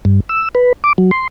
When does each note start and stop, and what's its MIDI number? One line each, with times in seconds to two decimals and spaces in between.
0.05 0.20 43
0.29 0.49 88
0.55 0.73 71
0.84 0.93 86
0.98 1.11 54
1.11 1.28 84